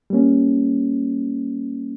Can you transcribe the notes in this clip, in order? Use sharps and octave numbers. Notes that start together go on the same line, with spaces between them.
G3 A#3 C#4